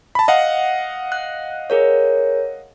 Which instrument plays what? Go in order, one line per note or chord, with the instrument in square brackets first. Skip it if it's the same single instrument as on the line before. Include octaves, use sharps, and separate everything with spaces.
[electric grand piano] A5 B5
D#5 F5 F#5
[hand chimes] F#6
G#4 A#4 C#5